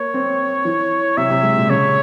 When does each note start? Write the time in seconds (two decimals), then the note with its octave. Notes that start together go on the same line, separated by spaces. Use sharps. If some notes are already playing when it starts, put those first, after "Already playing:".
Already playing: A#3 C#5
0.14 C4
0.65 E3
1.17 C3 E5
1.30 C3
1.43 G#3
1.57 A#2
1.70 C#3 C#5